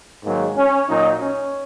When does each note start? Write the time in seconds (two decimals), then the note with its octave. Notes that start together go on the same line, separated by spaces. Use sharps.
0.24 G#2 D#3 F#3 A#3
0.56 C#4
0.88 A#2 F#3 D#4
1.20 C#4